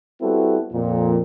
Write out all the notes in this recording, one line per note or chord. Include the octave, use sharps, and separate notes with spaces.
G3 B3 C4 E4 F#4 A4
F2 A#2